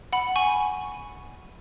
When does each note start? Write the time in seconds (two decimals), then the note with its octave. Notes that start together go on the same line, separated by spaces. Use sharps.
0.13 F#5 B5
0.36 G#5 C#6